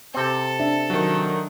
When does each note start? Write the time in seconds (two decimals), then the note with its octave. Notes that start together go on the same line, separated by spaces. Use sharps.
0.14 C3 C4 A4
0.60 D4 E5
0.90 D#3 F#3